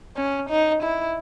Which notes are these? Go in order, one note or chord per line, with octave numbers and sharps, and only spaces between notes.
C#4
D#4
E4